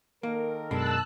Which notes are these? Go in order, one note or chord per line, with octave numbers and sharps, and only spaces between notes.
D#3 A#3 A4 A#4
F#2 B2 G#3 D4 A5 B5 E6 F#6